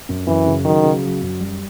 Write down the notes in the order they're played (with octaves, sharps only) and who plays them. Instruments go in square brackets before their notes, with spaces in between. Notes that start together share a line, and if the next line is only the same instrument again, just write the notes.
[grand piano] F#2
[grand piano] F#2 [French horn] E3
[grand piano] C#3
[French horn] D#3 [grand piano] F#3
[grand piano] C#3
F#3
F#2
G3